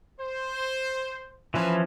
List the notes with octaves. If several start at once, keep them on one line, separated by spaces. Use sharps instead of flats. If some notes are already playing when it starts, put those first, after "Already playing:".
C5
E3 F3 C#4 B4 G#5